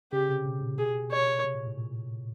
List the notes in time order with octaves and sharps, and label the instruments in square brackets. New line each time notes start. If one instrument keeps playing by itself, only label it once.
[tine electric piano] C#3 [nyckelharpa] G4
[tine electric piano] C3
B2
A#2
[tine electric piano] B2 [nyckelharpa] G#4
[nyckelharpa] C#5
[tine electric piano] C3
A#2
A2
A#2